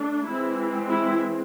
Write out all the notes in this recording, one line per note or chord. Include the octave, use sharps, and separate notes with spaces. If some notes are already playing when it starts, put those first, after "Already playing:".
Already playing: A3 D4
E3 G#3 C4 E4
E4